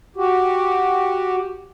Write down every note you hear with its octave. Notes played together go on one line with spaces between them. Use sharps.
F#4 G4